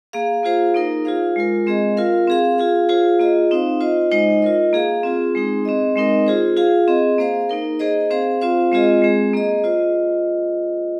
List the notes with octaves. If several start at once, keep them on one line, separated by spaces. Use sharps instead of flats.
A#3 G#4 F5
A#3 F4 G#4 C5 F5
A#3 D#4 A#4
F4 G#4 C5 F5
G#3 F4 A#4
G#3 C4 G#4 D#5
F4 A#4 F5
C4 G#4 F5
F4 G#4 F5
F4 G#4 C5 F5
A#3 F4 G#4 D#5
C4 D#4 C5 F5
F4 C5 D#5
G#3 D#4 C5 D#5
F4 A#4 D#5
A#3 G#4 F5
C4 F4 G#4
G#3 C4 D#4 G#4
C4 G#4 D#5
G#3 C4 D#4 A#4 D#5
F4 G#4 C5
F4 G#4 F5
C4 G#4 D#5
A#3 G#4 C5 F5
A#3 D#4 A#4
A#3 G#4 C5 D#5
C4 G#4 C5 F5
C4 F4 C5 F5
G#3 C4 F4 G#4 D#5
G#3 C4 G#4
A#3 G#4 D#5
F4 C5 D#5